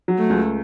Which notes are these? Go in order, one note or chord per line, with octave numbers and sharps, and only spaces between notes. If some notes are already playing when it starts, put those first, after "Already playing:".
F#3
A3
C#2